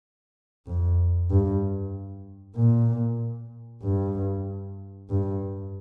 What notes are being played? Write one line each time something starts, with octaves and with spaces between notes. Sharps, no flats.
F2
G2
A#2
G2
G2